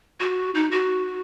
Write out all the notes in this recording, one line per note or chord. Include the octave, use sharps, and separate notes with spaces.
F#4
D#4
F#4